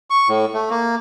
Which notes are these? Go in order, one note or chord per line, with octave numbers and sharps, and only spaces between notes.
C#6
A2
A3
A#3